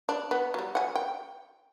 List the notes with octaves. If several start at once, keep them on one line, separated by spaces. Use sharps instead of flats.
D4
B3
F#3 G3
F#5 G#5
G5